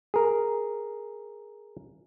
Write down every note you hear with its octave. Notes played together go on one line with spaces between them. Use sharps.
G#4 A#4